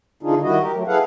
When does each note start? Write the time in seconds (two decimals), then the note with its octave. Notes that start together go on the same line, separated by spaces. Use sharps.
0.23 D3 E3 D4 D#4 F4 G#4
0.43 D#3 G3 E4 F#4 D#5
0.61 G4 A#4
0.73 F#3 A3
0.87 E4 G#4 A4 B4 F5 F#5